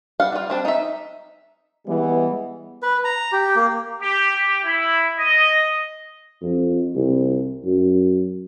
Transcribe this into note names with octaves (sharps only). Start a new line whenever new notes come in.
G3 F5 F#5
G3 F4
G3 C4 D4
D#4 E5
E3 G3 G#3 B3
B4
A#5
G4
A#3
G4
G4
E4
D#5
F2
C2
F#2